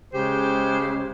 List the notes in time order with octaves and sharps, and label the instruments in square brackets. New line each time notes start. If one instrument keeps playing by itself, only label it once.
[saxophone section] C#3 G#3 G4 C5